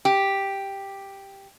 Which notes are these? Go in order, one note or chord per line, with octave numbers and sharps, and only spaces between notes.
G4